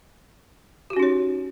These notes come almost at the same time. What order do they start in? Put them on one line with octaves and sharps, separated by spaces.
G4 F#4 C#4 D#4 C#5